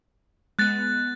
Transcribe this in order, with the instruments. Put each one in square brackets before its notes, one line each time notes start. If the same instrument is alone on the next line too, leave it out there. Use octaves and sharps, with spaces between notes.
[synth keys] G#3 B3 [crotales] F#6 A6